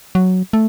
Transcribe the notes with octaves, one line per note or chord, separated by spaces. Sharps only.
F#3
A3